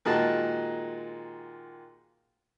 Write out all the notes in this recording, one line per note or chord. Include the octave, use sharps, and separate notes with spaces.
A#2 D#3 G#3 F#4 G#4 A5